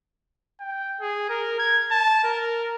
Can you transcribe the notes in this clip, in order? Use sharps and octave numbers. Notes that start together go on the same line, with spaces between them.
G5
G#4
A#4
G#6
A5
A#4